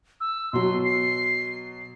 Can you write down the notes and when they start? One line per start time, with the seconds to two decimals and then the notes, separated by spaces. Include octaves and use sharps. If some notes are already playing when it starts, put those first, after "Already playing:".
0.21 E6
0.53 B2 F#3 C6
0.85 C7